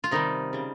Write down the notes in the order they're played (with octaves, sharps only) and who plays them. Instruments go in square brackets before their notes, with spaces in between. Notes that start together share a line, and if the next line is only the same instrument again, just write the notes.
[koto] F4
C3 D#3 G3 D#4
C#3 G3